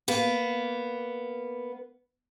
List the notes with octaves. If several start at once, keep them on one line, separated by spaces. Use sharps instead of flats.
A#3 B3